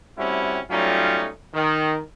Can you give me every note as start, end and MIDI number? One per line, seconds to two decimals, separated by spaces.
0.18 0.60 55
0.18 0.60 57
0.18 0.60 60
0.18 0.60 61
0.18 0.60 64
0.18 0.60 66
0.70 1.29 54
0.70 1.29 55
0.70 1.29 57
0.70 1.29 61
0.70 1.29 63
0.70 1.29 65
1.54 2.00 51